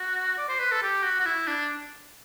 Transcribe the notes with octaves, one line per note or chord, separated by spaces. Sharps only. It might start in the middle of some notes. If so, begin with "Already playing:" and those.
Already playing: F#4
D5
C5
B4
A4
G4
F#4
F#4
E4
D4